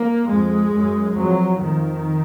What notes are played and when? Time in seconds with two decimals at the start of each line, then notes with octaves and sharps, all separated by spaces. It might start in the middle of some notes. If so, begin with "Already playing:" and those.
Already playing: A#3
0.27 F2 G#3
0.72 F#2
1.16 F2 F#3
1.60 F2 D#3